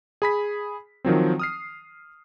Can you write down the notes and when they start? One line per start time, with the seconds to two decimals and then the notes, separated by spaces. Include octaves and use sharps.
0.22 G#4 B5 B6
1.05 D#3 F3 F#3 C4
1.39 D#6 F6 C7